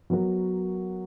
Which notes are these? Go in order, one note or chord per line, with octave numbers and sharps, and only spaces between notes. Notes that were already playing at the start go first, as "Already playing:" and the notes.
F#3 B3 F#4 A#4